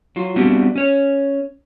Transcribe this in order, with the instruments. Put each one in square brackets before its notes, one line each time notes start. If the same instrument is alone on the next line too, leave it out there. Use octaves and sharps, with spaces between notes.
[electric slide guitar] F#3 F4
G3 B3 C4 D4 F#4 G4
C#4 C#5